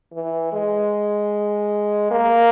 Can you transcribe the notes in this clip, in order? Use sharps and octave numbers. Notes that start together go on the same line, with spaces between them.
E3
G#3
A#3